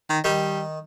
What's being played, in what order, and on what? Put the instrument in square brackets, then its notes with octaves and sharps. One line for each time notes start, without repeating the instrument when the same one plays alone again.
[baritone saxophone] D#3
[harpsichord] D#3 [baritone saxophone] G3